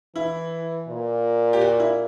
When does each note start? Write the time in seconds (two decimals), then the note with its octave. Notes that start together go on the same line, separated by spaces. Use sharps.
0.16 E3 E4
0.88 A#2
1.53 G4
1.61 F#4
1.80 E4